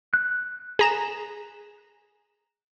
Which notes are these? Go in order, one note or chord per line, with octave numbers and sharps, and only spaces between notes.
F#6
G#4 A#5 E7